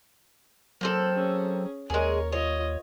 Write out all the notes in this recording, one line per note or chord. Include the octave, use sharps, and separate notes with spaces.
F#3 A#3 C4 A4
C#4 G#4
D#2 G#3 G#4 A#4 C#5
F4 C#5 D#5